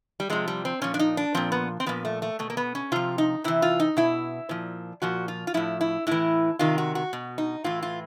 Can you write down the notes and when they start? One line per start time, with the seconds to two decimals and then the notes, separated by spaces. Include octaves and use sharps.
0.20 G3
0.30 C3 F3 G#3
0.48 G3
0.65 C4
0.81 A#2 F3 C#4
0.94 D4
0.99 D#4
1.17 D4
1.34 A#2 F3 C4
1.52 B3
1.80 C4
1.86 A#2 F3 B3
2.05 A3
2.22 A3
2.39 B2 A3
2.50 A#3
2.57 B3
2.75 C#4
2.92 C3 F3 F4
3.18 D#4
3.44 C3 E3 E4
3.62 F4
3.80 D#4
3.97 B2 E4
4.49 A#2 F3
5.02 A#2 F3 F#4
5.28 F4
5.47 F4
5.54 A2 F3 E4
5.81 E4
6.07 A2 E3 E4
6.59 C3 D#3 F4
6.78 F#4
6.95 F#4
7.13 B2
7.38 D#4
7.64 A2 E3 F4
7.82 F4